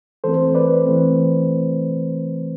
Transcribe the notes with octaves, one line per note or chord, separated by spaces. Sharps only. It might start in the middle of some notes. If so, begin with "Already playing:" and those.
E3 A3 C4 A4 C5
B4 D5
E3 A3 C4